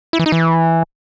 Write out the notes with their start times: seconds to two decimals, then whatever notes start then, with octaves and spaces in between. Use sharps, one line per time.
0.13 E4
0.19 E3
0.26 D#4
0.32 E3